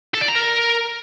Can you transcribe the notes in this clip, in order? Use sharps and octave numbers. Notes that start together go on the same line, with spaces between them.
A4
D5
A#5
A#4